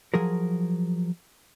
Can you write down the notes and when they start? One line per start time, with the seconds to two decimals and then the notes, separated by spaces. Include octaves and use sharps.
0.14 F3 F#3 G#4 A#4